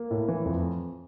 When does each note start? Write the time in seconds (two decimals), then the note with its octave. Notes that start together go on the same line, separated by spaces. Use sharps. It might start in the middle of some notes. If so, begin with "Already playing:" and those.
Already playing: A#3
0.11 A2
0.28 E3
0.46 F2